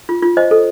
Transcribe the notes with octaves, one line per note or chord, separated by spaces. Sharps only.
F4
F4
C5 D#5
A4